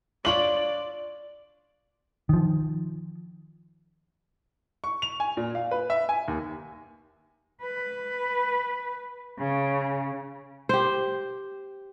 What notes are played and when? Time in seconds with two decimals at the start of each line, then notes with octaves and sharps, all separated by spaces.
0.25 D4 F4 C#5 D5 F#7
2.29 D#3 F3
4.84 C#6
5.02 F7
5.20 G#5
5.37 A#2
5.55 F5
5.71 B4
5.90 E5
6.09 G#5
6.28 D#2
7.63 B4
9.39 C#3
10.69 G4 C5